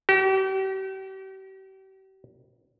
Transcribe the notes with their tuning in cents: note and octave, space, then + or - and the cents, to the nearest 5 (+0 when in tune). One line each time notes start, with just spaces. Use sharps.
G4 -40